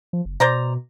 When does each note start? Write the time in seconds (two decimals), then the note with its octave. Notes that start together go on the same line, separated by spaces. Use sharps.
0.13 F3
0.25 F#1
0.40 B2 C5 D5 A#5